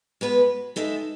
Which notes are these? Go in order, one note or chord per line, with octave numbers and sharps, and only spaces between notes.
G#3 B3 F#4 B4
G#3 D#4 A4 E5